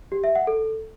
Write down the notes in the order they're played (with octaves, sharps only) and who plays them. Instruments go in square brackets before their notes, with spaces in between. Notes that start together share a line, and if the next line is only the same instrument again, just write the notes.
[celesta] G4
E5
F#5
A4